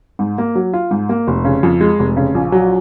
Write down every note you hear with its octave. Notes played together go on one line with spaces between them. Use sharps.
G#2
A#3
F#3
F4
G#2
A#3
F1
C#3
F2
G#3
F1
C#3
A#1
F#3